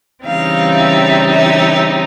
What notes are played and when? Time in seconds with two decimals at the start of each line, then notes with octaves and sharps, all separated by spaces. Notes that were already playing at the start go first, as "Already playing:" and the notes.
0.25 C#3 E3 G3 C4 D#4 F5
0.76 E5
1.29 E5